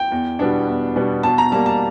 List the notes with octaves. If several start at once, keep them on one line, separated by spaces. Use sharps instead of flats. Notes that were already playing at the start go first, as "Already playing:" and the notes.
Already playing: G5
E2
B2 G3 B3 D4
E2
B2 G3 B3 D4
B2 A5
A#5
G3 A#3 A5
A5